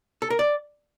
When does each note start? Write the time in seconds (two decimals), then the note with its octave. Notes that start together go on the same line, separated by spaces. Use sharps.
0.22 A4
0.30 A#4
0.39 D5